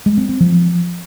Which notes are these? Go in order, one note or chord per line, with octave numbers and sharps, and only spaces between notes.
G#3
C4
C4
F3